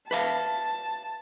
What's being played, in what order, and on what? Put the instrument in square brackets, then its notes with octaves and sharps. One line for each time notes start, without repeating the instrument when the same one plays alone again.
[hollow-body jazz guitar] B4 E5 F5 [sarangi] A5